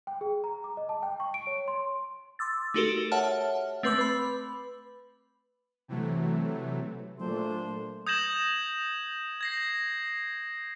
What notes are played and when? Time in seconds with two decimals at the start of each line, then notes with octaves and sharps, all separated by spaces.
0.07 G5
0.21 G#4
0.44 A#5
0.64 D6
0.77 D#5
0.89 A5
1.03 G5
1.20 C#6
1.34 D7
1.47 C#5
1.68 C6
2.39 C6 D6 E6 A6
2.74 A3 D#4 F#4 G4 A4 A#4
3.12 C#5 E5 F#5 A5 F6
3.83 A3 C4 B4 C6 D6 E6
3.99 B4 B5
5.88 C3 E3 F#3 A3
7.20 A#2 F#3 A3 D4 C5
8.07 D#6 G6 G#6 A#6 E7 F#7
9.41 G#6 A#6 C7